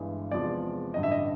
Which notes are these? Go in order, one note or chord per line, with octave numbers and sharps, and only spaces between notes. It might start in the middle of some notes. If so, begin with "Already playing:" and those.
Already playing: G1 G2 E3 G#3
E2 C3 F3 G#3 D5
A1 G2 D3 D#5
E5
D#5